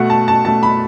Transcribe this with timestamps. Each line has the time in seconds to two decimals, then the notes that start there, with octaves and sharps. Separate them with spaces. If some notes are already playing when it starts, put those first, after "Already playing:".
Already playing: B2 A3 F#5
0.10 A5
0.28 A5
0.45 B2 A3 A5
0.63 B5